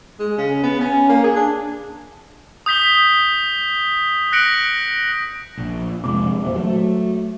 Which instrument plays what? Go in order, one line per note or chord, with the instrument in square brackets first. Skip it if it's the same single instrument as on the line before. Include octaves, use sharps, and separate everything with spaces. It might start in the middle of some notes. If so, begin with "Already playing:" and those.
[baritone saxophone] G#3
C#3
B3
C#4
A#3
G#4
D4
[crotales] D#6 G6 B6 G7
F#6 A#6 C#7 D7 F#7
[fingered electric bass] A#1
[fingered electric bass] F2 C3 G#3 [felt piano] D6
[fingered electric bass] E2 A#2 [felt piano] C5 E5
[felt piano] F#3 [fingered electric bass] A3